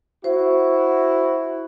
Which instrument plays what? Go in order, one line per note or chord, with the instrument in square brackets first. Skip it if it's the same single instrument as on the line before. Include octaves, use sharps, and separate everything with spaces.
[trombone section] E4 F#4 [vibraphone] C5